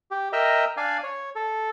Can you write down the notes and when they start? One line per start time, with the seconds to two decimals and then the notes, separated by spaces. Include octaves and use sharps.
0.11 G4
0.33 A#4 D#5 E5 G5 A#5
0.77 D4 D5 F5 G#5
1.04 C#5
1.36 A4